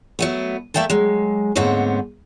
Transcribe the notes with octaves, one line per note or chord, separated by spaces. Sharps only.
F#3 A3 B3
A3 A#3 E5 G5 A5
F#3 G#3
D#2 G#2 D3 B3 C4 C#5